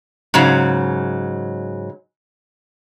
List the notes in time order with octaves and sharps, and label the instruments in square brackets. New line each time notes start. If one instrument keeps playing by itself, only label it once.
[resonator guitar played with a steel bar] G#2 C#3 F#3